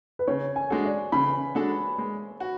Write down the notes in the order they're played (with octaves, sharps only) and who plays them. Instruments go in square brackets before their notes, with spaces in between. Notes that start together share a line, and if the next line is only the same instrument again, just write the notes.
[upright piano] B4
[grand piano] C#3 [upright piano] C#5
[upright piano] G#5
[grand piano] G#3 D4 F#4 A4
[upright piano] D5
[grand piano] C#3 [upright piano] B5
[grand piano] G#3 D4 F#4 A4
G#3
F#4